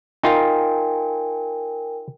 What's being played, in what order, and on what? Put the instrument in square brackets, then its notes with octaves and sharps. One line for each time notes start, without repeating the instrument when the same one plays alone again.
[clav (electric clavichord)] D#4 F4 [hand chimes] A#4 G5 G#5